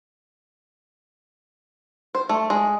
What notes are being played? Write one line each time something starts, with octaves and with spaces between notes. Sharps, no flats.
C5
A3
G#3